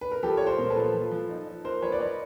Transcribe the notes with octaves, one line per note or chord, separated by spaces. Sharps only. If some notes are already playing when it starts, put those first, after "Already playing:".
B4
A#4
F3 G4 A4
F3 C#5
A#4 C5
A#2
A4 B4
F3
F3
F3
D#4
D#4
A#3 A#4 C5
F3 B4 C#5
D5
A#3 C#5 D#5